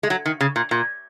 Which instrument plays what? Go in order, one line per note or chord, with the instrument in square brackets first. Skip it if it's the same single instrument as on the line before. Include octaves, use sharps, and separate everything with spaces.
[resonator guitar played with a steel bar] G#3
F#3
D#3
C#3
A#2
A#2